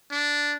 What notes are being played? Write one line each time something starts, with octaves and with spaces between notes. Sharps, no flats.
D4